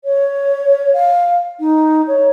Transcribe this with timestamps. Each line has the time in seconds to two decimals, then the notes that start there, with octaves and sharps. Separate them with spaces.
0.04 C#5
0.93 F5
1.59 D#4
2.07 C#5